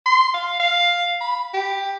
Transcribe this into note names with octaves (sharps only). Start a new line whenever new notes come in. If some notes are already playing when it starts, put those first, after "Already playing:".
C6
F5
F5
B5
G4